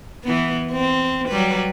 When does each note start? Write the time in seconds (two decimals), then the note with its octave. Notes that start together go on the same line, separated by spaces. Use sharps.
0.24 E3 B3
0.72 C4
1.28 F#3 G3 B4